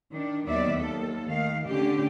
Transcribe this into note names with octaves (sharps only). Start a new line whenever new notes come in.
D#3 D4
D#2 D#3 F#3 B3 D5 E5
D#2 A4
D#3 A3 F5
D3 A3 C#4 D4 G4